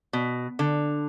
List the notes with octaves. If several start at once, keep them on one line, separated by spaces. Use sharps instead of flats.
B2
D3